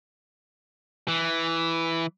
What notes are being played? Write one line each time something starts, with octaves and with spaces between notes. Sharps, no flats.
E3